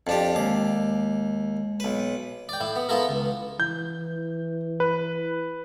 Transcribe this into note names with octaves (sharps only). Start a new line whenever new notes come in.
F2 D4 G4
D#2 G#3 D6
B1 B4
D5 G5
A2 E4
B3
B3 E4 F4 A4 A#4
C#2
E3 G6
B4